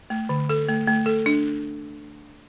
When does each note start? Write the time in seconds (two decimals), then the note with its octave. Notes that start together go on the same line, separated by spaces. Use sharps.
0.10 A3
0.29 D3
0.49 A4
0.69 A3
0.88 A3
1.06 A4
1.26 D4